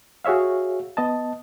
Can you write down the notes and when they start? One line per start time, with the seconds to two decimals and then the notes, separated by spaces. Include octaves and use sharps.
0.25 F#4 G#4 C#5 E5 F5
0.97 B3 D#5 A5